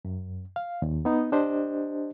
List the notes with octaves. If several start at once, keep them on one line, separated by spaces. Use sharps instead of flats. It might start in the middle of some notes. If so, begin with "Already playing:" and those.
F#2
F5
D#2
B3 D#4
D4 G4 C5 D#5